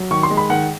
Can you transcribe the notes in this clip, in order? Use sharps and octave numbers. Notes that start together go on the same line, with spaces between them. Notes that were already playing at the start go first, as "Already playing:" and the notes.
Already playing: F#3
D#3 C#6
C6
G#3
B5
D#3 F#5